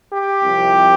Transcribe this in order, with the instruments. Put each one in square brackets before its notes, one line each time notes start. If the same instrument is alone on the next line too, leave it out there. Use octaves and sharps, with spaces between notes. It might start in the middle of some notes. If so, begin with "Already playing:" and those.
[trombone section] G4
C2 C3 F3